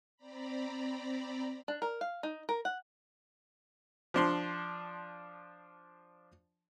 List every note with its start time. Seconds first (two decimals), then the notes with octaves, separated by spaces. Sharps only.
0.17 C4 D5 A#5 B5
1.68 D4
1.82 A#4
2.01 F5
2.23 D#4
2.49 A#4
2.65 F#5
4.14 F3 D4 C6